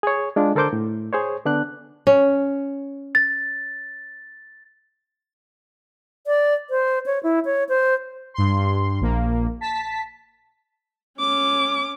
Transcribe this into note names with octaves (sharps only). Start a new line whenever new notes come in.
G#4 C#5
G#3 D4 F4
D3 A4 A#4 C5 D6 G6
A2
G#4 C5 C#5
D3 B3 D4 F#6
C#4
A6
D5
C5
C#5
E4
C#5
C5
G2 C6
A#1 A#3
A5 B6
C#4 D6